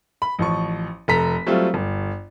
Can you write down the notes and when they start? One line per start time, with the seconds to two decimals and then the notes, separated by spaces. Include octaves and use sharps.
0.22 B5
0.39 A1 F3 C#6
1.08 F1 A4 A#5 B6
1.47 F#3 G3 A3 C4 F4
1.74 G1